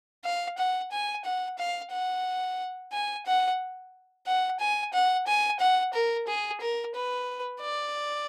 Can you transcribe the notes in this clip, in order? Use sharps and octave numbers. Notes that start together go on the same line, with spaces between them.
F5
F#5
G#5
F#5
F5
F#5
G#5
F#5
F#5
G#5
F#5
G#5
F#5
A#4
G#4
A#4
B4
D5